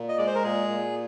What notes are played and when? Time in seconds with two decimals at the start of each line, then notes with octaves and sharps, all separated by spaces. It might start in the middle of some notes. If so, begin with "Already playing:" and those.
Already playing: A#2
0.09 D#5
0.18 G#3 D5
0.27 C5
0.35 A#4
0.43 A#2 G#4
0.68 A#2